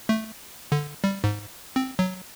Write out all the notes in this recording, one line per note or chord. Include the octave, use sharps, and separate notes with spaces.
A3
D3
G3
G#2
C4
F#3